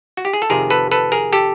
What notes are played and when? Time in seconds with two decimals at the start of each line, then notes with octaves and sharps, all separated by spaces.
0.17 F#4
0.25 G4
0.33 G#4
0.42 A4
0.50 F2 C3 D#3 G#4 A#4
0.70 A4 B4
0.91 A4 B4
1.12 G#4 A#4
1.33 G4 A4